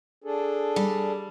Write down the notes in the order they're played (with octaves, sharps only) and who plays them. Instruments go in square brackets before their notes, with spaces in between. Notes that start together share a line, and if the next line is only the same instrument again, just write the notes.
[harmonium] D4 G#4 A4
[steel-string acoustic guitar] G3